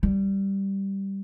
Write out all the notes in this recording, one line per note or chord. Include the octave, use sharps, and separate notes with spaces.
G3